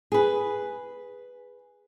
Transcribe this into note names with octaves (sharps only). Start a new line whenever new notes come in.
G#4 B4